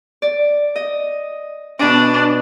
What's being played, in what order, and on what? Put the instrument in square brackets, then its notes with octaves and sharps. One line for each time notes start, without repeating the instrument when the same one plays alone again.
[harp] D5
D#5
[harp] B2 D#5 D6 [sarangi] D4